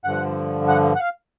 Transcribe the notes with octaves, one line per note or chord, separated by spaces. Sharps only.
G2 D3 F3 F#5
F#5
F#5
F5